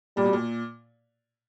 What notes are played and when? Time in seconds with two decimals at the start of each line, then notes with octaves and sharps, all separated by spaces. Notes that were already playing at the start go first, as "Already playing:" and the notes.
0.17 A#2 G3
0.25 B2
0.33 A#2